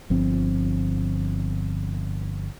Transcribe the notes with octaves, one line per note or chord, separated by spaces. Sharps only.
G1 F3 C4